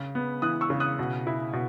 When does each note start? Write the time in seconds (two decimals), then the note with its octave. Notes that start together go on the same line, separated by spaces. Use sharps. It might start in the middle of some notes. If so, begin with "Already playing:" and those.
Already playing: C#3
0.15 B3
0.42 E3 D#6 F#6
0.61 C#6 E6
0.70 C#3
0.80 D#6 F#6
0.99 B2
1.27 E4
1.53 B2